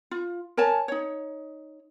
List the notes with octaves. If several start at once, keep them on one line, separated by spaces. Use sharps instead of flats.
F4
A#4 C#5 G#5 A5
D#4 C#5